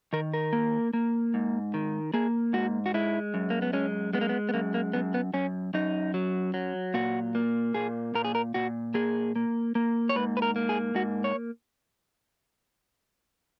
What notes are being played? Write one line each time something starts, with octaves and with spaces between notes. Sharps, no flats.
D#3 A#4
A#4
A#3
A#3
G#2
D#3
A#3 G#4
G#2 F#4
F#4
G#3 E4
F#2
A#3
B3
G#3 C#4
G#3 B3
A#3
B3
B3
F#2 A#3
A#3
F#2 B3
B3
F#2 C#4
F#2 D#4
F#3
F#3
A#2 F#4
A#3
A#2 G#4
A#2 A#4
G#4
A#4
A#2 F#4
A#3 G#4
A#3
A#3
C#5
G#2 B4
B4
A#4
A#3
G#4
G#2 F#4
C#5